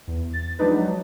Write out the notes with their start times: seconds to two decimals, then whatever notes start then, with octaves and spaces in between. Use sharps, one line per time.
0.08 E2
0.33 A6
0.59 F3 F#3 G#3 D4 D#4 B4
0.71 F#3